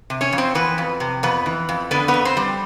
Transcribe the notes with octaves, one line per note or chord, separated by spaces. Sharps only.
C3
C#4 C#5
F2
C4 C5
E3 B3 B4
F2
C3
F2 B3 B4
E3
F2
D3 B3 B4
B3 B4
F2
C4 C5
G3